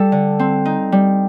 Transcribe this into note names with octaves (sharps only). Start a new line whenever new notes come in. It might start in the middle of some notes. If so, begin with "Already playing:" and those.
Already playing: G3 A4
D3
C4
D#4
G3